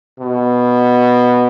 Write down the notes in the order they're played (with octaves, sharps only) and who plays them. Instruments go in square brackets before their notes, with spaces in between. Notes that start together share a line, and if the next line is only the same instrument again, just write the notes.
[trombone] B2